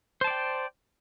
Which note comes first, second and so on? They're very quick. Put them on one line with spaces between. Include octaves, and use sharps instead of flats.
C5 A5 D5 G5